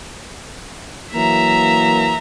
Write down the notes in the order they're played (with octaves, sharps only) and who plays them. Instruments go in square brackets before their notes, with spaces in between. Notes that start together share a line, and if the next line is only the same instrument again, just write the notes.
[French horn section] E3 F#3 A#3 [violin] E5 A#5